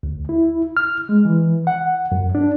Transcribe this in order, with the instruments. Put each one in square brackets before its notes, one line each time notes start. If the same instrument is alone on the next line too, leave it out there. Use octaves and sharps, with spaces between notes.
[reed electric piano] D2
E4
F6
G#3
E3
F#5
F#2
D4